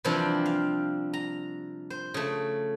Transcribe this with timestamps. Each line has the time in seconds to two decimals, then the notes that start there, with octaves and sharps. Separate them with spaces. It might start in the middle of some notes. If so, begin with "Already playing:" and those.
0.05 C3 E3 F3 G3 C4 D4
0.46 F5
1.13 A#5
1.90 C5
2.14 C#3 A3